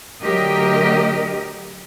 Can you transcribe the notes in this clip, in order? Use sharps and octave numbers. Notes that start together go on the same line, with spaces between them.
D3 F#3 A3 G4 A#4 D#5